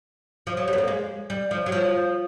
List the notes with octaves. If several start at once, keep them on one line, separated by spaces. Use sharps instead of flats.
F3
F#3
G3
B3
A#3
G#3
G3
F3
F#3
F3